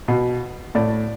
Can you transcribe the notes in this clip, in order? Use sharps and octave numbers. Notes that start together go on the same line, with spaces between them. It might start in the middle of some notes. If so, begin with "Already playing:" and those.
B2
A2 D5